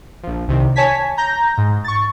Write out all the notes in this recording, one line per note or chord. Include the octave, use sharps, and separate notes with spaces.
A#1 F3
C2 C3 D#3
C#5 G#5 A5 G#6 B6
A#5 G6 A#6
G#2
C#6 A6